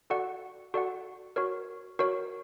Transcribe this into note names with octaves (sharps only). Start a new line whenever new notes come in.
F#4 A4 D5 F#5
F#4 A4 D5 F#5
F#4 A#4 C#5
F#4 A#4 C#5